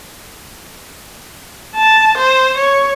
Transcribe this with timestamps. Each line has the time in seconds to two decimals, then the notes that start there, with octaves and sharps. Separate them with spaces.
1.76 A5
2.18 C5
2.57 C#5